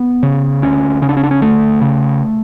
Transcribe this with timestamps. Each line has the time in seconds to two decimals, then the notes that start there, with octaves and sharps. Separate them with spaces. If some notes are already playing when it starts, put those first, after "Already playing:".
Already playing: B3
0.23 C#3
0.62 D2 C#4
1.02 C#3 C#4
1.09 D4
1.17 C#4
1.23 D4
1.31 C#4
1.41 D2 A3
1.82 C#3